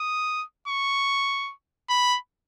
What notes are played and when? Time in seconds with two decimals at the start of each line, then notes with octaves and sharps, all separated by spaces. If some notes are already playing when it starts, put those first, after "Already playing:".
Already playing: D#6
0.68 C#6
1.90 B5